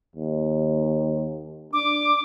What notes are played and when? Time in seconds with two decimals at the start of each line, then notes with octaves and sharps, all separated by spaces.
0.16 D#2
1.73 D4 D6